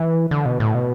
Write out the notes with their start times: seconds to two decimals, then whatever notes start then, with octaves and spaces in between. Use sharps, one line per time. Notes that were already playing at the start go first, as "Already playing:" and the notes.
Already playing: E3
0.31 D3
0.45 B2
0.60 A2
0.75 B2